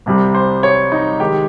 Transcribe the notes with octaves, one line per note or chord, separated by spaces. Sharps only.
C2 C3 G3
C5
C#5
D#4
D#3 G#3 G4